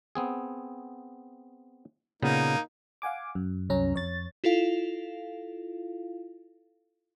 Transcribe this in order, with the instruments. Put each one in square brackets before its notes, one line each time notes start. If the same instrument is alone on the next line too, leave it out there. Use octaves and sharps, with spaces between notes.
[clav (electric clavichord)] B3 C4 G#4
[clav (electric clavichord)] A#2 C#3 B3 [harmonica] A#3 D#4
[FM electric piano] F5 F#5 G#5 D6
F#2
C2 F#2 C#4 A#5
F2 C#5 A6
[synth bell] E4 F4 A4 F5